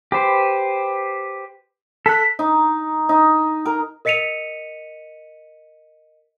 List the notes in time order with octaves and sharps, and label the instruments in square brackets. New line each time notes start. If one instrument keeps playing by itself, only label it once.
[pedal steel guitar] G4 B4 C5
[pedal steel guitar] A4 F#6 [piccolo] B6
[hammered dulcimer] D#4
D#4
A#4
[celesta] A#4 D#5 B6 C#7 D#7 F7